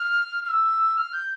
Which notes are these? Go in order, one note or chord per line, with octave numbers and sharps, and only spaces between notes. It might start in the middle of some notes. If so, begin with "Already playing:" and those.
Already playing: F6
F6
E6
F6
G6